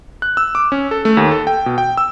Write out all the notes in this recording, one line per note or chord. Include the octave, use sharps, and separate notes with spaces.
F#6
E6
D6
C#4
A4
A3
D#2
A4
G5
B2
G5
E6